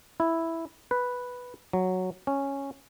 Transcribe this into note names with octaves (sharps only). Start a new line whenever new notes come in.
E4
B4
F#3
C#4